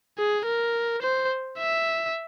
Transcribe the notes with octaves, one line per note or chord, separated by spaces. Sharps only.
G#4
A#4
C5
E5